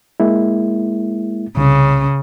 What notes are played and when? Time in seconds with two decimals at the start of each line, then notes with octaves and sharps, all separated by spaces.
0.20 G#3 A#3 E4
1.57 C2 C#3 C#4